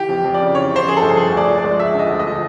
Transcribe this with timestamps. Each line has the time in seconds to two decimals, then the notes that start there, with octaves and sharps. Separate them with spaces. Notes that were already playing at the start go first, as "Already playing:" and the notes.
Already playing: E3 G4
0.09 F2
0.24 F2
0.34 D5
0.40 C#3
0.55 E3 C#5
0.70 C#3
0.76 C5
0.86 F2 G#4
0.97 G1 A4
1.17 F3 G#4
1.32 D2
1.37 D5
1.49 F3
1.58 D5
1.64 G#3
1.78 F3 E5
1.95 D3 D#5
2.10 D2
2.19 D#5
2.26 F3